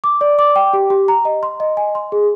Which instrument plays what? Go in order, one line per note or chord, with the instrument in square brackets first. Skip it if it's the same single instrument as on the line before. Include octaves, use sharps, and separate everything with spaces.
[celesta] D6
D5
D6
G5
G4
G4
A#5
D#5
C6
D#5
G#5
C6
G#4